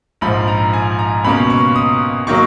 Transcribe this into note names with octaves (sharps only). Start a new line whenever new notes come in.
A#1 G#2 F3 B5
A#5
G#5
A#5
C#2 B2 A#3 C#4 B5
C#6
D#6
D#3 F#3 A#3 C#6